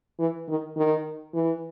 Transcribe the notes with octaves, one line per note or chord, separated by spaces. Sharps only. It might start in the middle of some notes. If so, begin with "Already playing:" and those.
E3
D#3
D#3
E3